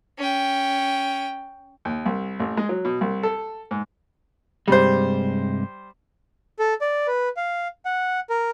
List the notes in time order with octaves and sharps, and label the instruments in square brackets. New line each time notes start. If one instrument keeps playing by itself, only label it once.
[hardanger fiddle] C#4 G5
[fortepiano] D#2
C2
A1
G#3
F#3
B2
C2
A4
G#2
[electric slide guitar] G2 C3 G#3 [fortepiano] G3 C5
[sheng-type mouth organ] A4
D5
B4
F5
F#5
A#4